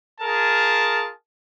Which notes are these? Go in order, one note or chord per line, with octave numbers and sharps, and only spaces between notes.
F4 G#4 A#4 A5